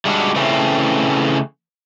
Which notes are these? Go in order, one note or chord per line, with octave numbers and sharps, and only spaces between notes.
G3 G#3 D4 F#4
C#3 E3 A3 C4 C#4